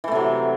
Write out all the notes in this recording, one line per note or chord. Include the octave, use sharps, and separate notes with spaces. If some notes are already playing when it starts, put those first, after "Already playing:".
C3 E3 F#3 A3